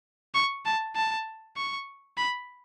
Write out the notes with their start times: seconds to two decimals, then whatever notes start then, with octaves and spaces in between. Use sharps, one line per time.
0.35 C#6
0.66 A5
0.96 A5
1.57 C#6
2.18 B5